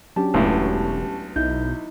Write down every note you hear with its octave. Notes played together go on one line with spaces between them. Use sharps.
F#3 C#4 D4 G4 A5
E1 C#2 A2 F#3 B3 F#4
B1 D#4 E4 G6